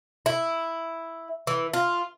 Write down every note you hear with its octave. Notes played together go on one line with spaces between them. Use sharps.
E4
E3
F4